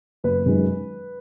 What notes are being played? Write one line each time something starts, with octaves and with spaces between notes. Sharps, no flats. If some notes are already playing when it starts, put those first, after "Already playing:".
F#1 B4
F#2 D#3 G#3